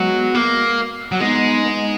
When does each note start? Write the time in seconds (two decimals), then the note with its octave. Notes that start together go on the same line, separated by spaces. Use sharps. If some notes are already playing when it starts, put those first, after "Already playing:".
Already playing: F#3 G#3 B3
0.35 A#3
1.12 F#3
1.20 G#3 B3 D#4
1.63 B3 D#4